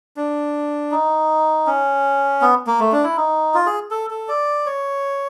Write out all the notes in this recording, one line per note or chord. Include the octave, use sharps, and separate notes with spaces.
D4
D#4
C#4
B3
A#3
A3
D4
E4
D#4
F4
G#4
A4
A4
D5
C#5